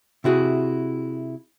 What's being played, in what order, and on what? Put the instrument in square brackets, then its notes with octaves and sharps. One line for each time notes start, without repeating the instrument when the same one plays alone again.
[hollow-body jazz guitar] C3 E4 F#4 G#4